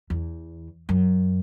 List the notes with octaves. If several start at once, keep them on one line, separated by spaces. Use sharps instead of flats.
E2
F#2